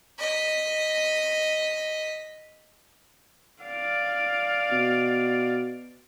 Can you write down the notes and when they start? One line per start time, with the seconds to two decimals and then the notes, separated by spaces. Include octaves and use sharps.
0.19 D#5 B6
3.63 D5 F5
4.72 B2